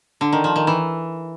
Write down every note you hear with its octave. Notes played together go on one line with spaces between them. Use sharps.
D3
D#3
F3
D#3
E3